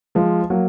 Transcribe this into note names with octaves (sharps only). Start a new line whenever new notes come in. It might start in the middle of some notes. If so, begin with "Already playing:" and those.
F3 G#3
F#3 A#3